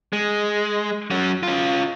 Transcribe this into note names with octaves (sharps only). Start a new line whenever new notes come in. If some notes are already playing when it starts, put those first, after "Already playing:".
G#3
F#3 C#4
C#4 F4